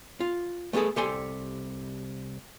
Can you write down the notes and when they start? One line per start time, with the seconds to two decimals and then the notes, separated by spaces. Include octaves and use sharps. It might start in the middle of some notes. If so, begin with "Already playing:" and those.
0.20 F4
0.73 A3 B3 F#4 G#4 A4
0.96 C2 G4 A4 G#5 C6